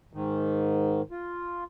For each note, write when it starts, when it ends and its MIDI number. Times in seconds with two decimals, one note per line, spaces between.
0.13 1.02 44
0.13 1.02 51
1.11 1.64 65